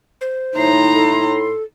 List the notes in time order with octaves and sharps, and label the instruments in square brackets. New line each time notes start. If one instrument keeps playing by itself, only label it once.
[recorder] C5
[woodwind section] A2 E4 C6 [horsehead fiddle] D#4 A#5
[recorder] A4